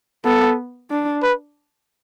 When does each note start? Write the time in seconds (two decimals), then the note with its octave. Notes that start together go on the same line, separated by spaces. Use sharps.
0.25 B3 A4
0.90 D4
1.22 B4